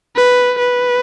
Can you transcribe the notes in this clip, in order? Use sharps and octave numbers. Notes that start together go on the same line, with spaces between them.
B4
B4